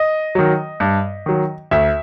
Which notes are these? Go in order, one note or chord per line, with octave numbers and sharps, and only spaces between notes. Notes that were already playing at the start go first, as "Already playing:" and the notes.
Already playing: D#5
D#3 F#3
G2
D#3 F#3
D2 E5